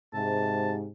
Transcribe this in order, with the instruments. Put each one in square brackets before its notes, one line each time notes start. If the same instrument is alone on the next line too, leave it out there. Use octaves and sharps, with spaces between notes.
[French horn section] G#2 C3 [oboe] A5